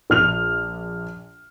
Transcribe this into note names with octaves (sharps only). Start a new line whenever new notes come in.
A#1 F6 F7